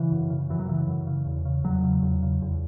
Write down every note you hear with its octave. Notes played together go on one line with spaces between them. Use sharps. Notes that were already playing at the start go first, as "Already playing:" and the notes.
Already playing: C#3 E3
F#2
C#3
F#2 E3
F#3
C#3 E3
F#2
C#3
E2
C#3
E2 F#3
C#3
E2
C#3
E2